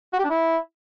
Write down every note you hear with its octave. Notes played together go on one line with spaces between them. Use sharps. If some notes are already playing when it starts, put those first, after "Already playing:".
F#4
G4
D4
E4